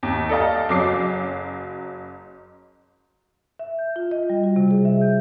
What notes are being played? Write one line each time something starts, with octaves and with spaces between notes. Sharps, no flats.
D#2
A4 D5 D#5 F5 A5
F#1 F#3 D6 C7
E5
G6
F4
D#5
G3
F#4
C3
G#4
E5
G6